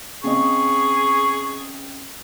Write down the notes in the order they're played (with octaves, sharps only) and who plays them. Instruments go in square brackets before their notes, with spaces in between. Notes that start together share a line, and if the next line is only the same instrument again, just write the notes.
[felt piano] C#3 C4 D#5 [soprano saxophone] G#4 [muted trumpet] C#6